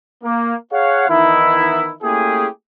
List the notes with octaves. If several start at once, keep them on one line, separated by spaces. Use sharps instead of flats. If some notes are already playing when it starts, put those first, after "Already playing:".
A#3
G#4 C#5 F5 F#5
D#3 E3 B3 D#4 E4
A3 A#3 C#4 E4 G4 G#4